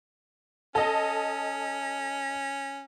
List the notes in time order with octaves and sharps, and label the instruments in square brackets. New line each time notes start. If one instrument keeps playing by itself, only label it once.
[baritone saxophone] C#4 [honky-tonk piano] A4 D#5